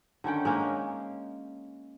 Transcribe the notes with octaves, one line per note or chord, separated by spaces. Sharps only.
D3 D#3 C#4 G5
G#3 A#3 C#4 D#4